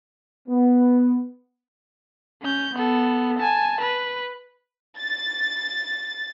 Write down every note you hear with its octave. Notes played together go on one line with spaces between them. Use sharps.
B3
C#4 G6
B3 A4
G#5 A5
B4
A6